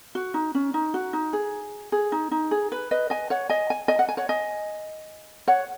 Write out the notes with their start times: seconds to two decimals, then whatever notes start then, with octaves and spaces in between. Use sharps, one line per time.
0.15 F#4
0.34 D#4
0.55 C#4
0.74 D#4
0.94 F#4
1.13 D#4
1.33 G#4
1.92 G#4
2.12 D#4
2.31 D#4
2.51 G#4
2.72 B4
2.91 B4 D#5
3.10 D#5 G#5
3.30 C#5 F#5
3.49 D#5 G#5
3.70 G#5
3.88 D#5 G#5
3.99 F#5
4.09 G#5
4.17 C#5 F#5
4.29 D#5 G#5
5.48 C#5 F#5